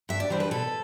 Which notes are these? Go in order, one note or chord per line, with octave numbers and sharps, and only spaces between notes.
G2 E5
D5
E3 G3 D4 C5
B4
B2 A4